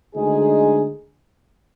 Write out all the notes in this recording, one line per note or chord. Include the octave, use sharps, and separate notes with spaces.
D2 D3 G#3 D#4 G#4